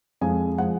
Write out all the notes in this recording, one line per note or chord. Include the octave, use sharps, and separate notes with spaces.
F2 F3 G#3 G#5
F3 G#3 F#5